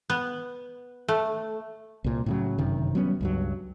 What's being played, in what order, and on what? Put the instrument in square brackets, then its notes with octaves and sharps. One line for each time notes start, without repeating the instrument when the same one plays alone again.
[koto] B3
A3
[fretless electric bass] C2 A#2
A2 C#3 F#3
G1 F#2 C3 D#3
F#3 G3 B3 C#4
C#2 G2 F#3